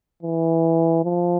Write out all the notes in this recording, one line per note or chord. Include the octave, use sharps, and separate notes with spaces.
E3
F3